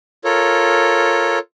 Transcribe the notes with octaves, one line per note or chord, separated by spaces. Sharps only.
F4 A4 A#4 C#5